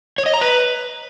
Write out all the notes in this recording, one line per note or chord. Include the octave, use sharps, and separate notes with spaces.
C#5
D#5
A#5
B4